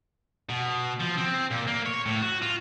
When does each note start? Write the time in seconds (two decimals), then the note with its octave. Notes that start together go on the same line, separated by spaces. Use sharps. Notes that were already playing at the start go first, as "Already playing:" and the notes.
0.49 B2
1.00 F3
1.17 C4
1.51 A#2
1.67 A#3
1.86 C#5
2.06 A2
2.22 F#4
2.42 F4